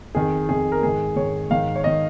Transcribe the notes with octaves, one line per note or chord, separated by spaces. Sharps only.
F2 D#3 G#4
F2 D#3 G#4
A#4
G#2 D#3 G#4
G#2 D#3 C#5
G#2 D#3 F5
C#5
D#3 D#5